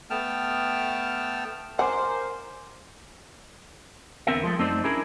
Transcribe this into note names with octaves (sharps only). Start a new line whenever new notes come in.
A3 B3 G5 A5 F6
A#4 C5 F#5 G#5 D6
E2 D3 B3 C4 A#4 E5
F3 G#3 A3
F#2 A3 C4 D#4 C5 D5
C#4 D4 E4 G#4 A#4